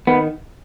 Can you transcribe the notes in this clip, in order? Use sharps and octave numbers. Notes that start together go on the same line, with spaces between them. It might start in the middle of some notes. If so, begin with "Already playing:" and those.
D#3 B3